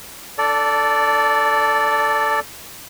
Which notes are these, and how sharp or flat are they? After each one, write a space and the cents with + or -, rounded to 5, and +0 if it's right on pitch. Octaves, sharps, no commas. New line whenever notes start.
D4 +20 A4 +5 D5 -15